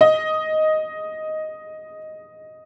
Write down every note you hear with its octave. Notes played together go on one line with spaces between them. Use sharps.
D#5